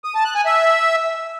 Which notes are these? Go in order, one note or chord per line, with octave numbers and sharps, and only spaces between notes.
D#6
A5
F#6
G#5
E5